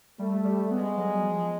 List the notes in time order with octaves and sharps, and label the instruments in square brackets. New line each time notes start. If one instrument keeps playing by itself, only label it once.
[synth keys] G3 [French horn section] A3
[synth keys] G3
[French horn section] G#3 [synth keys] B3
[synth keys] F#3
F3